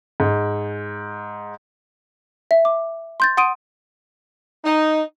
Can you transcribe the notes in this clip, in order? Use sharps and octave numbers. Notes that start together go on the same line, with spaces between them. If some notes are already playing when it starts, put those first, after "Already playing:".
G#2
E5
D6
C6 G6 A6
F#5 C6 D#6 D7 D#7
D#4